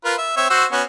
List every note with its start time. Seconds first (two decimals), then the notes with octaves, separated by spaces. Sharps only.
0.05 F4 A#4 B4
0.18 E5
0.37 C4 C#5 E5
0.50 F#4 C5 E6
0.72 B3 C#4 F#4